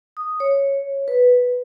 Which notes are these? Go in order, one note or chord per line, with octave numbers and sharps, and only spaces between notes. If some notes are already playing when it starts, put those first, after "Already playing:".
D#6
C#5
B4